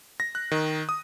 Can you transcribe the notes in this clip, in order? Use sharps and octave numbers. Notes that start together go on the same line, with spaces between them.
A#6
F#6
D#3
D#6